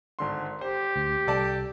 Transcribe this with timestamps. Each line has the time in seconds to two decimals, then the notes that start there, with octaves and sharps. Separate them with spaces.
0.19 G#1 D3 C6
0.61 G4 C5
0.96 D2
1.27 C2 A4 D5 A5